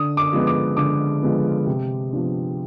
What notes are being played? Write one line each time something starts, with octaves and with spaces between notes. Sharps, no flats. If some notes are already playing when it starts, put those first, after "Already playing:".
Already playing: D3 D#6
D6
F3 G#3 B3
D6
D3 D6
F3 G#3 B3
C3
F3 B3 D4